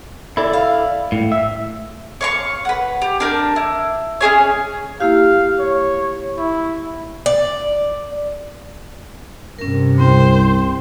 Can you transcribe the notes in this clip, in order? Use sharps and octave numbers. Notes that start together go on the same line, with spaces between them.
E4 A4 D5
F5
A2
E5
C#5 F5 C#6
B4 F#5
G4
D4 A#4 G6
E4
C#4 E4 G#4 C#5
A#3 E4 G4 F5
C#5
E4 C#6
D5
G2 C3 C#4 A#4
C2 C4 C5 G5